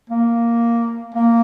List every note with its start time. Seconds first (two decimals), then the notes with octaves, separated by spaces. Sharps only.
0.09 A#3
1.14 A#3